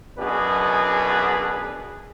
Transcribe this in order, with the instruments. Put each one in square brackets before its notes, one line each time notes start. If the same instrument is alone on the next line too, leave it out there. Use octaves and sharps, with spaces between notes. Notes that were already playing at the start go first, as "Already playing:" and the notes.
[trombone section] B1 F#2 B2 D4 G#4 B4